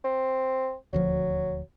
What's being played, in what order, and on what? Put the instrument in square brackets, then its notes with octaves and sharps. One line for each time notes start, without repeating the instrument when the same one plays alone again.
[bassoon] C4
[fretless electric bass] D#1 D2 F3 [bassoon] F#3